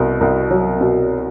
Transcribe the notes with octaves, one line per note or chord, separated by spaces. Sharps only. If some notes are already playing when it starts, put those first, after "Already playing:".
Already playing: C2 B2
C2
F#3
B2